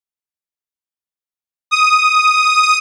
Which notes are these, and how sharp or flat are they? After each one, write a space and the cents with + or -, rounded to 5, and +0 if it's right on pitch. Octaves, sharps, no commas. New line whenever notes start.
D#6 +5